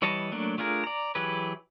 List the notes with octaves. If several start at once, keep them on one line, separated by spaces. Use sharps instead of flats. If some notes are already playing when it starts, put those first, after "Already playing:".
E3 G3 C#5 D#5 A5
F#3 A3 A#3 D4
A3 D4 F4 G#4 A#4
D5 A#5
E3 F#3 G4 G#4 B4